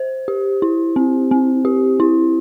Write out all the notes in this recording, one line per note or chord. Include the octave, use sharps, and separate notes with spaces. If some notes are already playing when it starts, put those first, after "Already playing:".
Already playing: C5
G4
E4
C4
C4
G4
E4